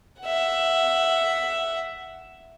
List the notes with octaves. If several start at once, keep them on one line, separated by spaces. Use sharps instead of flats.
E5 F#5